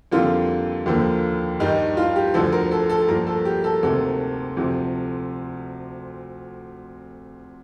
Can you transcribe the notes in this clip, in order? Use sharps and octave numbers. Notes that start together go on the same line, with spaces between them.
F2 D3 G3 A#3 F4
D#2 D3 F3 A#3
G2 D#3 G3 D#4
F4
G4
D2 D3 F3 A4
A#4
A4
A4
G2 F3 A#3 A#4
A4
G4
A4
D2 C3 D#3 A#3 A4
D2 C3 F3